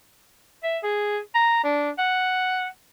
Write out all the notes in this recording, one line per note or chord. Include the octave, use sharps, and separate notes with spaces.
E5
G#4
A#5
D4
F#5